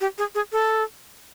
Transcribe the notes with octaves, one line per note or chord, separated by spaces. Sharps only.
G4
G#4
G#4
A4